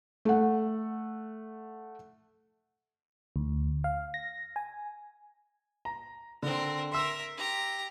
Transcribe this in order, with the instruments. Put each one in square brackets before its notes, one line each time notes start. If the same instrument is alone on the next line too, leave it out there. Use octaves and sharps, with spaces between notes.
[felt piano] A3 F#5
[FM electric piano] D2
F5
A#6
G#5
[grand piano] A#5
[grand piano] D3 [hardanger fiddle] C4 A#4
[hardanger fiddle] A#4 E5 [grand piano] C6 E6
[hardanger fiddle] G4 A#5